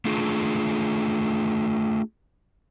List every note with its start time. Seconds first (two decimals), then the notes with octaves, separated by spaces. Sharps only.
0.05 A3 D4 F4 G#4